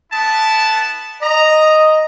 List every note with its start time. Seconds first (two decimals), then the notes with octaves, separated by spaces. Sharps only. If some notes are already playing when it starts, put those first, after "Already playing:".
0.12 B3 E4 A5
1.22 D#5 A#5